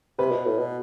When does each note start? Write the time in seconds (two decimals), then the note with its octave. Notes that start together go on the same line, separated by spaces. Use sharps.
0.19 C3 B4
0.32 B2
0.45 A2
0.58 B2